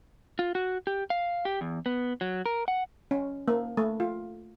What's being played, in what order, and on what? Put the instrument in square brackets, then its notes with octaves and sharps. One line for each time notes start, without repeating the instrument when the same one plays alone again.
[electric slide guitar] F4
F#4
G4
F5
G4
E2
B3
F#3
A#4
F#5
[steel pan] C#4
A#3
A3
F4